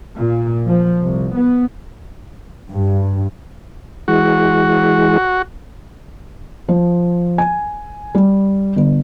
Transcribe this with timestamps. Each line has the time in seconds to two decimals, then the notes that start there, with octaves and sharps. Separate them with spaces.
0.18 A#2
0.67 F3
1.01 C2
1.36 B3
2.72 G2
4.08 E3 G#3 F#4
6.69 F3
7.38 G#5
8.15 G3
8.76 G1